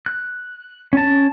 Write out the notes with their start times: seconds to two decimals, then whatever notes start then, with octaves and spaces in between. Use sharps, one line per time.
0.06 F#6
0.93 C#4 A5